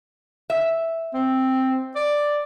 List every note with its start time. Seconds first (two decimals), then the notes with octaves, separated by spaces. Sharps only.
0.50 E5
1.14 C4
1.96 D5